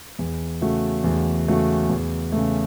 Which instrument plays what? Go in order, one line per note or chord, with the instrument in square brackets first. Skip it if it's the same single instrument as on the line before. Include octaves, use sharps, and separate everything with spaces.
[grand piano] E2
C#3 A3 F#4
E2
C#3 A3 F#4
E2
C#3 A3